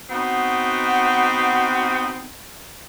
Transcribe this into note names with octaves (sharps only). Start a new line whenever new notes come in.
B3 C4 D#4 F#4